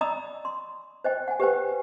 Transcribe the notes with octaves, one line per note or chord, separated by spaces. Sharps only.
D5 D#5 A#5 B5 D#6 E6
C6
C5 D#5 G5
F#5 G#5
G4 B4 C5 G5